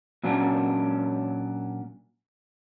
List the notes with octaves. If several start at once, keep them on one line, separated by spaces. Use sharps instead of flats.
A#2 F#3 C#4 D4